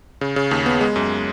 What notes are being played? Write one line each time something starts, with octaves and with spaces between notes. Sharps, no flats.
C#3
C#3
D#2
B3
G#3
F#2